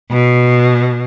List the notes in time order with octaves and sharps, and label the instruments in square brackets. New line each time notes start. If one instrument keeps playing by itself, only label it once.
[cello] B2